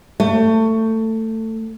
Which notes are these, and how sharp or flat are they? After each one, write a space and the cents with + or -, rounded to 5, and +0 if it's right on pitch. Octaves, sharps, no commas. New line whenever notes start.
A3 +20